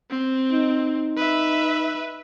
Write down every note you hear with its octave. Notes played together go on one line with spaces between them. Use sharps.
C4
D#4
B4 E5